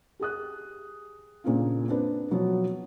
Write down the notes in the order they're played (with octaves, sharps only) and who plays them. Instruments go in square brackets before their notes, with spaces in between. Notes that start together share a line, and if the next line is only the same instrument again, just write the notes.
[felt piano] G4 G#4 D#6 F#6
A#2 C#3 A#3 C4 D4 F4
C4 D4 B4
B2 F3 F#3 B3